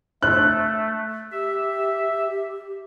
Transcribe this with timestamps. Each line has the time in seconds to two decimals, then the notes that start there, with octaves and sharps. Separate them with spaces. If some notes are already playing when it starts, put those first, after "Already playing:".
0.23 A3 F#6
1.32 G4 E5